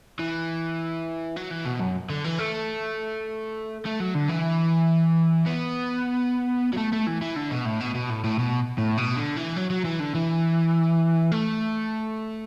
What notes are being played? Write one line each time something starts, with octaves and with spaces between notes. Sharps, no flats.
E3
F#3
E3
B2
F#2
D3
E3
A3
A3
F#3
D3
E3
B3
F#3
A3
A3
E3
E3
D3
B2
A2
B2
B2
A2
A2
B2
A2
B2
D3
E3
F#3
F#3
E3
D3
E3
A3